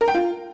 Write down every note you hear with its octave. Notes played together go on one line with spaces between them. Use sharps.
A#4
G5
F4